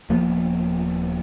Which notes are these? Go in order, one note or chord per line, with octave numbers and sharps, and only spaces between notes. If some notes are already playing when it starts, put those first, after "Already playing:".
D#1 F3 A#3 B3